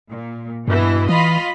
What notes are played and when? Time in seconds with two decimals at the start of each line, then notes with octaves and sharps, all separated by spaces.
0.10 A#2
0.68 G2 B2 E3 E4
1.09 E3 F4 D#5 B5